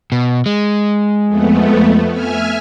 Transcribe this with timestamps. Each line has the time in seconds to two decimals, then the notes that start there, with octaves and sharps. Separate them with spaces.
0.12 B2
0.46 G#3
1.26 F2 A3 B3
2.11 E5 G#5 F6